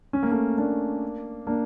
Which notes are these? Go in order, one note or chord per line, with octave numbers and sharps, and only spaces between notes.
C#4
A#3
A3 C#4
A#3 D4
A#3 D4